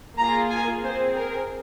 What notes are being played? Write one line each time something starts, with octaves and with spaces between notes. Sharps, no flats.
A#3 F4 G#4 A#5
G#5
C4 G#4 C5
A#4